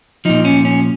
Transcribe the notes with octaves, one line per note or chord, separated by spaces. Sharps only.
A#2 F3 D#4
C#4
C#4